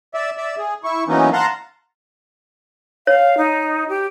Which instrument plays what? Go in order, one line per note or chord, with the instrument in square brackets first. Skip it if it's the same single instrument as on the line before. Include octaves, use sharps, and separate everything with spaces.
[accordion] D5 E5
D5 E5
G#4
E4 C#6
E3 F#3 A#3 B3 C#4 D#4
F5 F#5 A5 A#5 C6
[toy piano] C#5 [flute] F5
[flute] D#4
G4